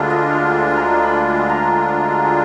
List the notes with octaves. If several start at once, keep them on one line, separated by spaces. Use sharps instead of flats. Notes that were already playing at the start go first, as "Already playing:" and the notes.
Already playing: D2 D3 G#3 D4 F4 B4
D#5
F5
G#5
G#5
A#5
B5
B5
A#5
A#5
A#5